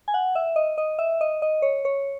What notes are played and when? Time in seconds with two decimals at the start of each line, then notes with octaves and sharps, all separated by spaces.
0.08 G#5
0.14 F#5
0.35 E5
0.56 D#5
0.78 D#5
0.99 E5
1.21 D#5
1.42 D#5
1.62 C#5
1.85 C#5